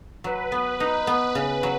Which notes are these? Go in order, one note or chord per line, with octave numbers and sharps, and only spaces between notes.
F#3 B4
B3
D#4
B3
C#3
F#3